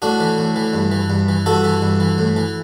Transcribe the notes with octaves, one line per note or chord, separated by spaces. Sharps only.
A2 D4 F#4
E3
A2
E3
G2
E3
G2
E3
G2 F#4 A4
E3
G2
E3
A2
E3